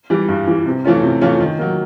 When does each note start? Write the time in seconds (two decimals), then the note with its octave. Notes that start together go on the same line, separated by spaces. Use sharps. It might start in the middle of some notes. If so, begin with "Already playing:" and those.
0.10 E3 G3
0.29 G2
0.47 E3 G3
0.66 C3
0.84 E3 A3 C#4 F4
1.02 C3
1.21 E3 A3 C#4 F4
1.40 D#3
1.59 F#3 A#3